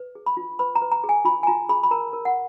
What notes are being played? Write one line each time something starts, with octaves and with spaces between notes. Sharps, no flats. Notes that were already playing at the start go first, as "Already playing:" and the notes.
Already playing: B4
G#4
B5
F4
B4 B5
A#5
B4
A#5
G#4
G#5
F4 B5
G#5
F4 A#5
G#4 B5
B5
A#4 A#5
A#4
F#5